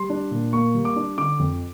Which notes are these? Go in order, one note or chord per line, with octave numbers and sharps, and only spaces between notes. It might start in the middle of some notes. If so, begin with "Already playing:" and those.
Already playing: G3 C6
D4
A#2
A#3 C#6
G3
D6
D4
D3 D6
F2